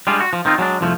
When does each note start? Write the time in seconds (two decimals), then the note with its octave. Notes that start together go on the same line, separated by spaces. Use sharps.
0.07 G3 G#3 D4 F4
0.21 F#4
0.33 F3
0.45 D#3 C4 D#4 F4
0.58 F#3 G#3 C#4 D4
0.81 C2 F2 F3 A3